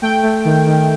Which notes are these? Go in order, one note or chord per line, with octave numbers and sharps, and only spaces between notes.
A3 G5
A3
D#3
D#3